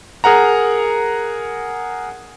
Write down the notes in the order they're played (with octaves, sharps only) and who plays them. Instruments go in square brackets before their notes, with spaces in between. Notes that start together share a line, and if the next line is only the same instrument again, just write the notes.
[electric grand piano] G#4 A#4 F#5 A#5